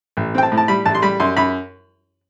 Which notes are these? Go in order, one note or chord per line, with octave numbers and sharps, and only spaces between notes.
A1
C4 G5
A5
A2
A5
G3 B5
A1 A5
C6
G3 B5
F#2 C6
F#2 B5